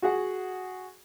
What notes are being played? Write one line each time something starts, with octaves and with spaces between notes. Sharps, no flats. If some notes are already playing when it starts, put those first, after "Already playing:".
F#4 G#4 F#5